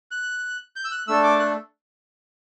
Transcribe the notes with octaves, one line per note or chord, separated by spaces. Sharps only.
F#6
G6
E6
F#6
A3 D4 A4 E6
D6
F#6